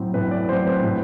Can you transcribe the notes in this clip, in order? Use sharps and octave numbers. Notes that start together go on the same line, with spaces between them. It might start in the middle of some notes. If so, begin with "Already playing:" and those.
Already playing: A2 F#3 C4
A2 B4
D5
F#3 C4 C5
B4
A2